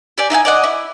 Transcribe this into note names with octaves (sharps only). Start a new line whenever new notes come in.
G4 D5 G#5
D#4 E4 G5 G#5
D5 D#5 F#5
E4